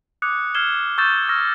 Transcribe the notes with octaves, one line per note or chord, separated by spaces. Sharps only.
D6 D#6 F#6 G#6 C#7
F6 G#6 C7 E7 G7
C#6 E6 G6 A6 E7
C#6 E6 F6 A#6